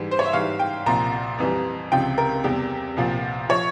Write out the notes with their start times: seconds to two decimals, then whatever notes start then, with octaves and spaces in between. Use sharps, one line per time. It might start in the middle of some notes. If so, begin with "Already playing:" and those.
Already playing: G#2 E3 G3
0.11 C5
0.19 C#5
0.26 E5
0.33 G#2 E3 G3 F5
0.59 G5
0.86 C2 A#2 F3 A#5
1.38 F2 E3 G3
1.92 C#2 C3 F3 G5
2.18 A#4
2.44 E2 C3 G3 G4
2.97 C2 A#2 F3
3.49 F3 C#5